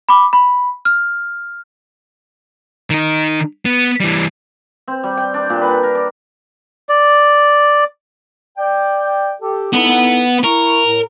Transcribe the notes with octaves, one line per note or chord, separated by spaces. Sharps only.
B5 D6
B5
F6
D#3 D#4
B3
E3 G3
C4
G3
G5
D4
A#2
B4
A#4
D4
D5
D5 G5
G4 A4
B3 D#4 E4 A4 B4
E4 A#4 C#6
A2